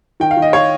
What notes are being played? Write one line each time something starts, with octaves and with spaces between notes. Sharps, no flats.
D#3 G5
F5
D#3
D#5
C#5 F5